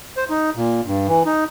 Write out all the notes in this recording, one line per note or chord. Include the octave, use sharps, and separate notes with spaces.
C5
D#4
A#2
G2
E3
D#4